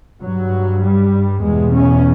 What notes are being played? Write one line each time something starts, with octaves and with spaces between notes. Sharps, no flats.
G2 F#3
G3
E2 B2 G#3
C#4